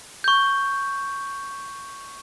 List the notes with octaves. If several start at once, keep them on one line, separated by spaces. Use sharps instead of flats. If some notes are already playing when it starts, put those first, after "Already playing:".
C#6 G6